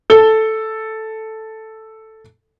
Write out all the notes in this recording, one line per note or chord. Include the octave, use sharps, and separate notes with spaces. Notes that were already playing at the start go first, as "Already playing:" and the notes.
A4 G7